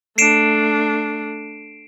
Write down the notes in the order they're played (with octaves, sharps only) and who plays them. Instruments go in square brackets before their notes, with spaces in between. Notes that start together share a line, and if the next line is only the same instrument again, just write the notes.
[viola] A3 D4 [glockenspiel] C7 D7 E7